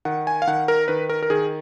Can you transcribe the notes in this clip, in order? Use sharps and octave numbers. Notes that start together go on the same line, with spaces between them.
D#3 F#5
G#5
F5
D#3 F#5
A#4
D#3 B4
A#4
A#4
D#3 G#4